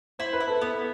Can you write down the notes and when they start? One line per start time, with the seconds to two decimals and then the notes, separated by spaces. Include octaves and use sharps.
0.19 E4 C5
0.33 B4
0.40 E4
0.47 A4
0.61 B3 B4